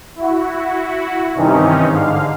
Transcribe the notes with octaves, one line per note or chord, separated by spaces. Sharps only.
E4 F#4
G2 C3 D#3 E3 C#4 D#4
G#2 D3 F5